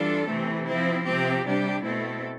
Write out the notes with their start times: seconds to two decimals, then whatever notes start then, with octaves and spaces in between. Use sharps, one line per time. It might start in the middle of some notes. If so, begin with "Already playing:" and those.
Already playing: E3 G3 D4 F4 A4
0.28 C3 E3 A3 C4
0.67 F3 C4 E4
1.06 C3 F3 C4 G4
1.45 C3 G3 D4 G4
1.83 B2 A3 C4 E4 A4